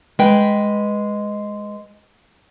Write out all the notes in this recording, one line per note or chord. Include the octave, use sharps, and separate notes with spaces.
G#3 B4 G5